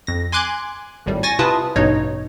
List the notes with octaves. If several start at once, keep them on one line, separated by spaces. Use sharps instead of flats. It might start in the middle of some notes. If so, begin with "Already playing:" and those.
F2 A#6
G#5 C6 D6 F#6 G#6
G#1 A2 G3
G#5 C#6 A6 A#6
C3 E4 F4 B4 A5 D#6
A1 G2 B2 D#4 C#5 D#5